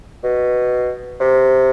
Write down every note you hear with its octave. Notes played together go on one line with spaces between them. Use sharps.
B2
C3